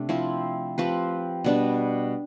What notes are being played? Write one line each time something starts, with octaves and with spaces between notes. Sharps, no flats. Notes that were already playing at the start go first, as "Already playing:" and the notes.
Already playing: C3 A3 D4
F3 C4 E4
F3 C4 G4 B4
B2 G3 B3 D4